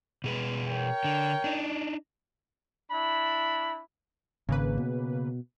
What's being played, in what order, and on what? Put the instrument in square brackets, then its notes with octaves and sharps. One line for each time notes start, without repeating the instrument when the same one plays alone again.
[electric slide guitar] B2 G#4 B4
[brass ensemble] A#4 C#5 G5
[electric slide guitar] D3
D4 D#4
[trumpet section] D4 E4 B5
[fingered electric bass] G#1 [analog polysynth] C#3 A#3 B4
[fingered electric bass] B2